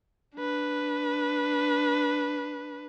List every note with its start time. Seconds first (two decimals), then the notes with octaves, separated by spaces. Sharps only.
0.36 D4 B4